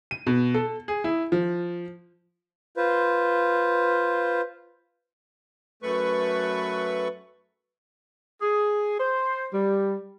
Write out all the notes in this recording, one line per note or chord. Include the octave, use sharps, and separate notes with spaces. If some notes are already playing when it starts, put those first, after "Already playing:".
D#7
B2
A4
G#4
E4
F3
F4 B4 C5
F#2 A3 B4 C#6
G#4
C5
G3